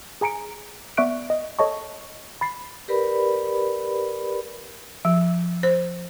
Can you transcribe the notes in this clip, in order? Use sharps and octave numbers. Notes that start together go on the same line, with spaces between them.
G#4 G#5 A#5 C#7 D7
B3 D5 E5 C#6 F#6 D7
D#5
A4 C#5 D#5 A5 C#6
B5 A6 C7
G4 A#4 B4 D5 B5
F3
C5